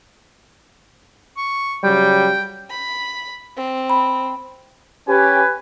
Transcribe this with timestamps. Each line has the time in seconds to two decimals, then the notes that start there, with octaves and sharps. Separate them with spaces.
1.37 C#6
1.84 C#3 F#3 G3 G5
2.70 B5
3.57 C4
3.90 B5
5.09 C#4 G4 B4 G#5